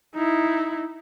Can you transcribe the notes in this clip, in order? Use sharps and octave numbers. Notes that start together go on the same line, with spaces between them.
D#4 E4